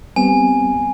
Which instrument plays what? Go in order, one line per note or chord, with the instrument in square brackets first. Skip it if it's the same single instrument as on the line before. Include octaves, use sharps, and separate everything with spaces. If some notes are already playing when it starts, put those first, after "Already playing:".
[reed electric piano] G3 B3 C4 [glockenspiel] G#5